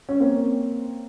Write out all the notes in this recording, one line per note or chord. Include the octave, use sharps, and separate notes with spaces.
C#4
A#3 C4